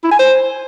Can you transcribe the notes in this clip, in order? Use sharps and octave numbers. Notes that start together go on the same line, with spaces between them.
E4
G#5
C5